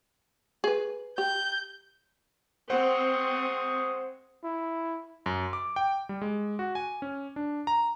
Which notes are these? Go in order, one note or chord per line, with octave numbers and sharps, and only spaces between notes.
G#4 B4
G4 G6
G#3 C4 C5 F#5 C#6 D#6
E4
F#2
D6
G5
G3
G#3
F#4
G#5
C#4
D4
A#5